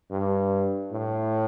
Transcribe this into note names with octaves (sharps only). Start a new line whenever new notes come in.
G2
A2